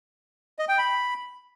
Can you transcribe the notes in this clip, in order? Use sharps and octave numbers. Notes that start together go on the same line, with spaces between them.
D#5
G5
B5